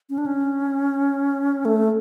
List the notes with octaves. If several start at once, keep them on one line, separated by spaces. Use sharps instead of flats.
C#4
D4
C#4
A3